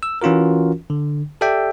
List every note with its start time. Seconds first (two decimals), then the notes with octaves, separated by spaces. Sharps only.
0.03 E6
0.22 E3 C#4 F4 F#4 A#4
0.90 D3
1.41 G4 A4 D5 E5 G5